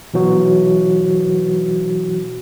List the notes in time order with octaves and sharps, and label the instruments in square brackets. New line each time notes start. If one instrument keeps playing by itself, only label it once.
[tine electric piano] B2 E3 F#3 F#4